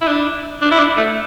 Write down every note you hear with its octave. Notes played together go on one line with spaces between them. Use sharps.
E4
D4
D4
E4
D4
A3